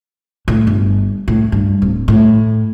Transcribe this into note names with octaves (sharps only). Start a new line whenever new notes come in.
A2
G1
A2
G2
D1
A2